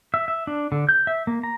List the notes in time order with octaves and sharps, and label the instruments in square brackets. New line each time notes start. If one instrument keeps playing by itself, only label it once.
[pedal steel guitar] E5
E5
D4
D3
G6
E5
A#3
A#5